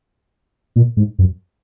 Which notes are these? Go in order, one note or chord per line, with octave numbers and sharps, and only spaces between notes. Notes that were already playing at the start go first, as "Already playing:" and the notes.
A#2
G#2
F#2